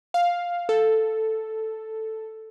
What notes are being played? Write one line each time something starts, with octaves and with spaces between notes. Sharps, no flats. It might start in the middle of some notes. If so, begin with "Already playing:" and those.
F5
A4